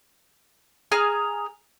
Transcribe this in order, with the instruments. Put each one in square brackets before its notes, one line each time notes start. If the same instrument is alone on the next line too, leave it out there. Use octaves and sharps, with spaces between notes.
[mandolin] G#4 G#5 A#5 F6